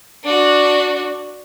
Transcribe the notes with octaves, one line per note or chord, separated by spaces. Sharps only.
D4 F#4